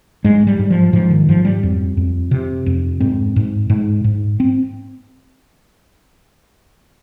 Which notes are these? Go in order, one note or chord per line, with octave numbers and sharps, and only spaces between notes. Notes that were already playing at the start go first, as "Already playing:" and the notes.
G#2 G#3
G3
G#2
F3
G#2 F3
D#3
G#2 F3
G3
F2
F2
C3
F2
G#2 C4
G#2
G#2
G#2
C4